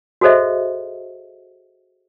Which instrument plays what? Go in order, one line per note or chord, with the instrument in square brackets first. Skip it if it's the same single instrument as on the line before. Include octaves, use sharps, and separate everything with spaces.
[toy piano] F#4 G#4 A4 C5 D#5 E5